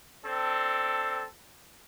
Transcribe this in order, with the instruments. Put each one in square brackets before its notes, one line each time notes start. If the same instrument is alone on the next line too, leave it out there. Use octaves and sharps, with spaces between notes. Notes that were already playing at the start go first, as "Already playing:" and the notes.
[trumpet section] C4 D4 A4